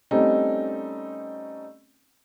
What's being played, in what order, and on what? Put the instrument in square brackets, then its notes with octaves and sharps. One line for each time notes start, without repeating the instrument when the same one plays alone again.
[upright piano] G3 A3 C4 C#4 D#4